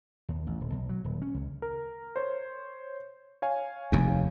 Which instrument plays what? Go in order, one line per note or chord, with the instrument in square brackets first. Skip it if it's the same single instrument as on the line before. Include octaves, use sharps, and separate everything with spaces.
[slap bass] D#2
A1
D#1
B1
F#3
D#1
C#4
C#2
[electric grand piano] A#4
C5 C#5
C#5 F5 G#5
[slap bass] F1 D#2